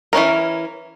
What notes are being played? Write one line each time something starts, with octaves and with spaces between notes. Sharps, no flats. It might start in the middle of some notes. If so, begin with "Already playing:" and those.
E3 F3 C#4 A#4